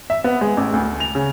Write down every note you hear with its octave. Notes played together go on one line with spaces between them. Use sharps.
E5
B3
G#3
A1
D2
F7
C#3